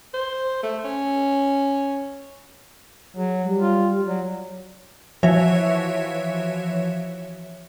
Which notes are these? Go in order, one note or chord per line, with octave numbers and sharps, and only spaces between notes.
C5
A3
C#4
F#3 G#4
G3
F4
F#3 D5
E3 F3 F#4 C#5 E5